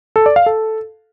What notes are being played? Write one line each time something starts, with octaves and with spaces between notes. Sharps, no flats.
A4
D5
F5
A4